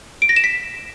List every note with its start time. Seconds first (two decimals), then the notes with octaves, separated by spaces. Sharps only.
0.22 D7
0.29 A#6
0.36 E7
0.44 B6